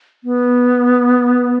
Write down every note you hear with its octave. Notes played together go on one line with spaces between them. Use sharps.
B3